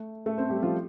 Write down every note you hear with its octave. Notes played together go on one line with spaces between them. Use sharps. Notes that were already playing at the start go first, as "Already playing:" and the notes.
Already playing: A3
A3 A4
C4 C5
G3 G4
F3 F4